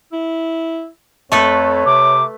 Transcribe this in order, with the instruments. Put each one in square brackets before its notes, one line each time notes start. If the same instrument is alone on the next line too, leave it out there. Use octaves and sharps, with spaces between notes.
[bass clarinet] E4
[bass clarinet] F2 [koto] A3 A4 B4 [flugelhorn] C#5
[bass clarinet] C3 [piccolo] D6